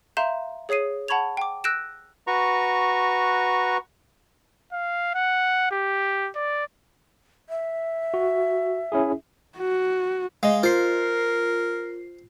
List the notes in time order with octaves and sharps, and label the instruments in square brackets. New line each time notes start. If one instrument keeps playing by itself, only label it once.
[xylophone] E5 F5 A#5 C6 G6 E7
G#4 C#5 D#6 C7 D#7
F#5 A5 B5 C#6 G#6 F7
G5 D6
E6 F#6 G6 A#6 D7 E7
[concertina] F#4 B4 A#5 C#6
[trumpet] F5
F#5
G4
D5
[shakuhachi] E5
[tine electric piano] F#4
C#4 E4 G#4
[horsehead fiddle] F#4
[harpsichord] G#3 [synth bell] D#5 F5
[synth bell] F4 C7 [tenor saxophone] A#4 [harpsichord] C5